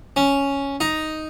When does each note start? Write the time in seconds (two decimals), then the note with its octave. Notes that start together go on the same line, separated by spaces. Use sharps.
0.16 C#4
0.80 D#4